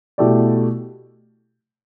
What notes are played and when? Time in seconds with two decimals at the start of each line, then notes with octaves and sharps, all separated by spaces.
0.18 B2 A3 E4 G4 D5